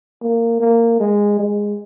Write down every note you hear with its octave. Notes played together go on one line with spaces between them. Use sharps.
A#3
A#3
G#3
G#3